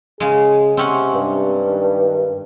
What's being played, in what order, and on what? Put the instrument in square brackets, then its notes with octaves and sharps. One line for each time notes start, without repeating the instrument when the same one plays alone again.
[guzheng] C#3 G#3 [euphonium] G#4
[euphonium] C3 [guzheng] C4 C#4 F#5
[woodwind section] G2
[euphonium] D#3